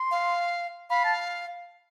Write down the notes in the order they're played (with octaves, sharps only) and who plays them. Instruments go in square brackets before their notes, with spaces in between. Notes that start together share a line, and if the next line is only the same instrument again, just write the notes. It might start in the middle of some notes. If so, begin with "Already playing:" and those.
Already playing: [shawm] C6
[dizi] F5
[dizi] F5 [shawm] B5
[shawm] A5